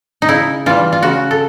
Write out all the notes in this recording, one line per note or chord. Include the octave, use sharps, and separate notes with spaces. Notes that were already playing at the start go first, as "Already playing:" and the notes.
D#4
C#3 E4
E3 G3 F4
F4
C#3 F#4
A4